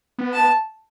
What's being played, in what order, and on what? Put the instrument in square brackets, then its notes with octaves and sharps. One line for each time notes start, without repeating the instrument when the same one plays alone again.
[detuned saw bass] B3
[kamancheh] A5